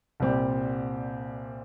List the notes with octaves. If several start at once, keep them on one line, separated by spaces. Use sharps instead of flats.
C2 A#2 G3 C4 G4